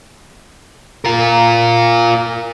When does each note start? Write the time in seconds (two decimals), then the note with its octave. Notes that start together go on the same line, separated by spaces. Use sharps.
1.05 F4 A#4